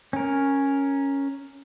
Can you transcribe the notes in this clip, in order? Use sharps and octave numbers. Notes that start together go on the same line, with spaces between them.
C#4 A#4